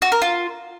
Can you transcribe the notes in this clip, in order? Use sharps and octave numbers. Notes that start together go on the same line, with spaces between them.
F#4
A#4
F4